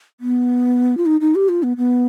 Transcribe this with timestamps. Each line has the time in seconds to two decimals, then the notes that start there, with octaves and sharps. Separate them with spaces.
0.20 B3
0.97 F4
1.06 D#4
1.21 D#4
1.35 G4
1.49 F4
1.63 B3
1.77 B3